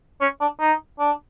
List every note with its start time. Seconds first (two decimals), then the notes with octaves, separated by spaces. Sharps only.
0.21 C#4
0.41 D4
0.60 D#4
0.99 D4